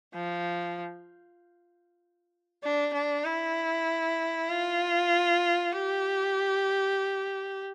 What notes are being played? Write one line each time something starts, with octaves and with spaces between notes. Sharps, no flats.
F3
D4
D4
E4
F4
G4